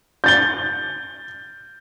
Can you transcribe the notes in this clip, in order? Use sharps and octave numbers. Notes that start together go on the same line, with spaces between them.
G6 A6 G7